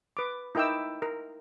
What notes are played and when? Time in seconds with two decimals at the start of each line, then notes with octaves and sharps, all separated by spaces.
0.17 B4 D6
0.55 D#4 E4 A#4 G5 D6 E6
1.02 A#4